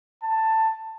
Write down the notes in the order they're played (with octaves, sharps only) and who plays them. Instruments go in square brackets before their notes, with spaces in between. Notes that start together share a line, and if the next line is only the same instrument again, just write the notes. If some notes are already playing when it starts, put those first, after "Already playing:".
[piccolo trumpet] A5